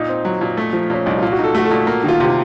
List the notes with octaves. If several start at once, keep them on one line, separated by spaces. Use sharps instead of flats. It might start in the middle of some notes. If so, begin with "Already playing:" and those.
Already playing: A#2 D#4
C4
F#3
A#2
A3
F3
A#2 C#4
C2 D#4
A#2 F4
F#4
D#4 A4
A3 F#4
A4
A#2
A#3
D#3 F4
C3
F4